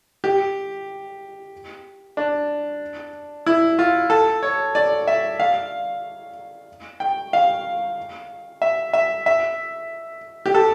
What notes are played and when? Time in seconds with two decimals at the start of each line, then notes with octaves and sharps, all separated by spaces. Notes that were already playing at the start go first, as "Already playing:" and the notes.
0.24 G4
2.17 D4
3.46 E4
3.79 F4
4.10 A4
4.43 C#5
4.75 D5
5.07 E5
5.40 F5
7.00 G5
7.33 F5
8.62 E5
8.93 E5
9.26 E5
10.46 G4
10.54 A4